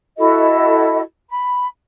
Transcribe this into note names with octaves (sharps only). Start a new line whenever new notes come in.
E4 F#4 A4 D#5
B5